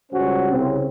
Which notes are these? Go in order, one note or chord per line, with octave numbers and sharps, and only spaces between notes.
C#2 G3 C#4 F#4 C5
C2 C#3 C4